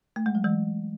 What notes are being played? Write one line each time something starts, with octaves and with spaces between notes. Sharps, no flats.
A3
G#3
F#3
E3 G#3